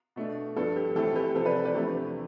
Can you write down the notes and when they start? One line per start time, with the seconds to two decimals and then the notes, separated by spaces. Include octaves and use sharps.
0.16 B2 A3 D4
0.56 G2 F3 B3 D4 A4
0.76 G4
0.96 A2 E3 A3 C4 A4
1.15 G4 B4
1.35 C3 F3 C4 A4 C5
1.45 B4 D5
1.65 B4 D5
1.74 E2 C3 F3 A3 D4 G4